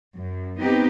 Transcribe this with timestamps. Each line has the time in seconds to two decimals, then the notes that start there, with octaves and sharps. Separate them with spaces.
0.14 F#2
0.59 B3 C4 D#4 G4 B4